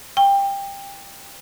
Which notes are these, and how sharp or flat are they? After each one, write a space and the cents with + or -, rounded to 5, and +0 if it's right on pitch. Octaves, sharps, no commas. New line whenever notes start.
G5 +20